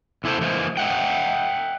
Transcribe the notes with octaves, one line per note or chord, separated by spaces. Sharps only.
E2 E3 E4 A4 C5
E3 G#3 A#3 C5
D#5 E5 F#5 G5